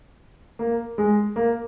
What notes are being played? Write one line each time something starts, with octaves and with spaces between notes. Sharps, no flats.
A#3
G#3
A#3